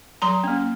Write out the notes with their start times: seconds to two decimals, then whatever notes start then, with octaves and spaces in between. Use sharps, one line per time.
0.22 F#3 A#5 C6
0.44 A#3 C#4